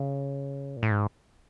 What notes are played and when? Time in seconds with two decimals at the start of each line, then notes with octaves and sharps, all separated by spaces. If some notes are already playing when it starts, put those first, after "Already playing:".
Already playing: C#3
0.77 A#2
0.83 A2
0.91 G#2